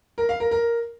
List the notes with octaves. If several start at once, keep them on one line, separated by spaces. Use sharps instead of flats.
A#4
F5
A#4
A#4